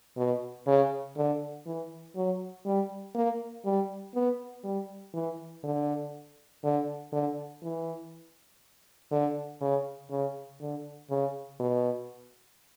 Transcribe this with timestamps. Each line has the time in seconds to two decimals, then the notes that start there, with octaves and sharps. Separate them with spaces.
0.17 B2
0.67 C#3
1.16 D3
1.66 E3
2.16 F#3
2.65 G3
3.15 A#3
3.65 G3
4.14 B3
4.64 G3
5.14 E3
5.64 D3
6.64 D3
7.12 D3
7.63 E3
9.11 D3
9.61 C#3
10.11 C#3
10.60 D3
11.10 C#3
11.59 B2